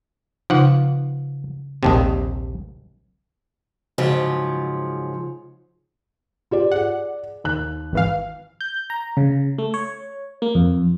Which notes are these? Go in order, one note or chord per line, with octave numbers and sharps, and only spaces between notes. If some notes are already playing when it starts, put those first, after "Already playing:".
C#3 F3 D#4 F#5
A#1 D#2 C3 G5 A5 D#6
G#2 C#3 F3 F#3
F4 G4 D5
G#4 D5 F#5
D#2 F#6
G#1 E3 F5
G6
A#5
C#3
A3
C#5
A#3
F2